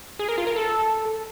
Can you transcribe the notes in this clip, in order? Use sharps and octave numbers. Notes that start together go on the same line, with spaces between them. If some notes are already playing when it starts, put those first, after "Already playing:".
G#4
A#4
F4
A#4
A4